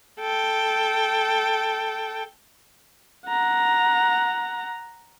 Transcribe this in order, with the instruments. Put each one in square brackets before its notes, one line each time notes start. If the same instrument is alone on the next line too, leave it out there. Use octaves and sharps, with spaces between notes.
[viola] A4 G5
[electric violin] F#5 A#5